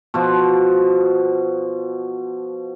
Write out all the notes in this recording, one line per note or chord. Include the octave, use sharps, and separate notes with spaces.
B2 F3